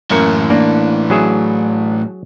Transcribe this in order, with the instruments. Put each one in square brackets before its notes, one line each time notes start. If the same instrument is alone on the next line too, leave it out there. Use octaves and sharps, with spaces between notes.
[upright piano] F#2 A#3 C#7 [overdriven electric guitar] A2 E3
[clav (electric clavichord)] A#3 [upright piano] D4
[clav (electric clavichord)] F#3 G#4 E5